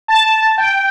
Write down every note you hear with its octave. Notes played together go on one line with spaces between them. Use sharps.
A5
G5